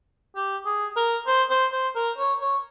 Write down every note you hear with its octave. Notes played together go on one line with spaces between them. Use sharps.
G4
G#4
A#4
C5
C5
C5
A#4
C#5
C#5